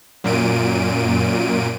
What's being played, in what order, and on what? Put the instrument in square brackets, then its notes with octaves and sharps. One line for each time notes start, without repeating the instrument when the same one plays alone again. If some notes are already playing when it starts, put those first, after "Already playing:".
[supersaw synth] F#2 A#2 D7 D#7